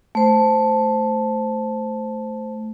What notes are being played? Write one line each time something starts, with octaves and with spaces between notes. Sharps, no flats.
A3 C5